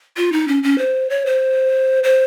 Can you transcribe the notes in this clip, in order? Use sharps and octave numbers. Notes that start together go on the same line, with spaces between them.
F4
D#4
C#4
C#4
C5
C#5
C5
C5